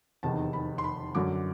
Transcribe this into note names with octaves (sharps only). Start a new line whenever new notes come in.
F1 E2 C3 D#3 A5
B5
C6
B5
F#2 D3 F#3 D6